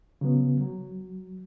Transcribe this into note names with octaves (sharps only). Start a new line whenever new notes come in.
C#3 F#3 B3
F#3